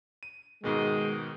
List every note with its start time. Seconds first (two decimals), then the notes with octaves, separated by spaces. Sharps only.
0.23 D#7
0.64 G#2 B2 D#3 G#3